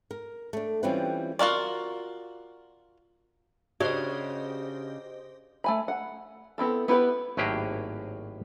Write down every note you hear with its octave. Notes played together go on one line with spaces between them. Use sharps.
A#4
A3 D4
E3 G3 C4 C#4 F4 B4
F4 F#4 A#4 D5
C#3 D4 F#4 G4 C5 C#5 D#5
A3 G#5 B5
F#5
B3 C4 E4 A4
B3 E4 G4 B4
G#1 A2 F#3 A#3 G4 G#4